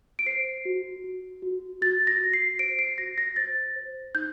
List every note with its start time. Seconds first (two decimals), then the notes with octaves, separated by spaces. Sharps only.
0.19 D7
0.26 C5 C7
0.65 F#4
1.04 F#4
1.42 F#4
1.82 F#4 A6
2.07 A#6
2.20 F#4
2.33 C7
2.59 C5 D7
2.79 C7
2.98 F#4 A#6
3.18 A#6
3.36 C5 A6
3.76 C5
4.15 D#4 G6